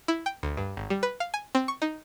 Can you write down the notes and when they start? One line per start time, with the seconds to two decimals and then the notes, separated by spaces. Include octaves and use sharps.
0.08 E4
0.26 G5
0.43 D2
0.57 G2
0.77 G#1
0.90 G3
1.03 B4
1.20 F5
1.34 G#5
1.55 C4
1.68 C#6
1.82 D#4